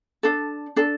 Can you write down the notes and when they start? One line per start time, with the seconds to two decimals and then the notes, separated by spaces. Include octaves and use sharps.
0.23 D4 A4
0.76 D4 A4